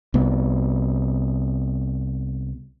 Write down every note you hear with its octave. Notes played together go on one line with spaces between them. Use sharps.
C2 B3